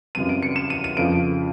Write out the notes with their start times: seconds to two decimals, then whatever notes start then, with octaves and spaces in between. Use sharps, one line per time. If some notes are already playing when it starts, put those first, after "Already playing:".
0.15 F#2 C#3 E3 G3 C4 D#7
0.29 D7
0.42 C#7
0.56 E7
0.70 D#7
0.84 D#7
0.97 F2 C#3 F3 D7